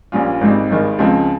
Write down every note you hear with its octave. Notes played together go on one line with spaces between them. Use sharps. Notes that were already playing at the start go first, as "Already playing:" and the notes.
A#1 A#2 G3 C#4 F4
G#1 G#2 G3 C4 D#4
G#1 G2 D#3 G#3
C#2 C#3 F3 G#3 C4